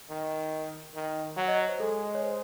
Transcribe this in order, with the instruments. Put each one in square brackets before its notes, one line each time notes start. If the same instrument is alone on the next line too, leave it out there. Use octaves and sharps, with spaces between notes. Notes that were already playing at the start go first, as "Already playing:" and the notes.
[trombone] D#3
D#3
[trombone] F#3 [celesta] F#5
[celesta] D#5
C#5
C5
[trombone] G#3 [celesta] A4
[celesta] C#5
C5